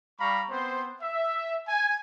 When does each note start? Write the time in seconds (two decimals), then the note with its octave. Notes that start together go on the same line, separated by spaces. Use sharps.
0.19 G3 F5 A#5 B5 C#6
0.50 B3 C4 C5
1.01 E5
1.68 G#5